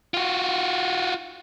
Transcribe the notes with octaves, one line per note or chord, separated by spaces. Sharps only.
F4 F#4